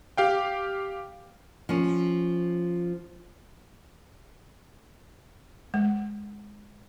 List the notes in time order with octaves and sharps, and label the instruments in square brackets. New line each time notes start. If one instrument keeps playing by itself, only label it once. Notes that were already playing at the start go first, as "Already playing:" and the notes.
[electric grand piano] G4 F5 G5
[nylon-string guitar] F3 C#4
[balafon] G#3